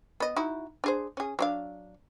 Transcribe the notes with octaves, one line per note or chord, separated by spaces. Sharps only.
B3 D#5
D#4 E4 F#4
D4 G#4 C5
C#4 G#4
F#3 D4 F5